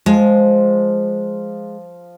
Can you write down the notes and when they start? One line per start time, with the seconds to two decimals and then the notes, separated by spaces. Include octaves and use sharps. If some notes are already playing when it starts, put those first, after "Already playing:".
0.06 F3 G#3